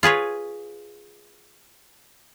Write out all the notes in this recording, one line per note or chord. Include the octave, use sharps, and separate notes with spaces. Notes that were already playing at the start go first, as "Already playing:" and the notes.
F4 G#4 B4 C#5